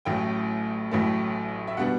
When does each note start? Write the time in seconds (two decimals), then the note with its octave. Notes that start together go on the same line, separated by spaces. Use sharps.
0.05 A1 A2 F#3 A3 G5
0.91 A1 A2 F#3 A3
1.67 E5
1.77 B2 G3 B3 D4 F#5